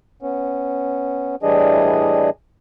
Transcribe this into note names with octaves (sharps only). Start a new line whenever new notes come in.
B3 C#4
A2 E3 G3 D4 G#4 D#5